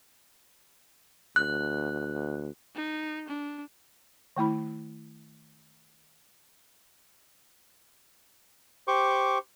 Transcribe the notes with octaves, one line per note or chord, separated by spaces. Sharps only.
D2 F#6
D#4
D4
D#3 A3 E4 B5
G4 C5 C#6 D6